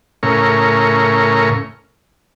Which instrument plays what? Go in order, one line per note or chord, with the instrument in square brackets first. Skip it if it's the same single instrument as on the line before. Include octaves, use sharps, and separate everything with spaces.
[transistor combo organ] A2 C#3 A#4 C#6